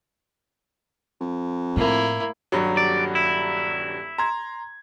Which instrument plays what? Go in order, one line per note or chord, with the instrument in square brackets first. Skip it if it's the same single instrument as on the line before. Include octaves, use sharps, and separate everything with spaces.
[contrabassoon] F2
[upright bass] A2 [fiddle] A#3 E4
[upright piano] D#1 G2 F#3
[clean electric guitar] D5
E4
[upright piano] A#5 C6 G#6